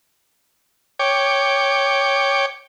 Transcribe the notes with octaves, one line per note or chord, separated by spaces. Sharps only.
C#5 G5 D6